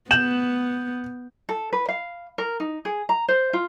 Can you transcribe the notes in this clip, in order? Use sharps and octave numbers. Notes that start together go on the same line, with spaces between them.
B3 G6 E7 F#7
A4
B4
F5
A#4
D#4
G#4
A#5
C5
F4